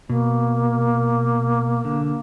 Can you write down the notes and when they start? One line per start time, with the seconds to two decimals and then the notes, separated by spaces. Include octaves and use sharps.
0.09 B2 A#3
1.85 D3